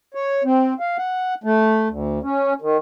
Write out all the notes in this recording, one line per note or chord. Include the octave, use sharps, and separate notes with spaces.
C#5
C4
F5
F#5
A3
D2
C#4
D#3